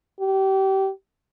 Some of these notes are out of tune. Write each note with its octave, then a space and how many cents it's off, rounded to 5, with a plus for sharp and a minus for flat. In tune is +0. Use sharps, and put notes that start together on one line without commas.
G4 -30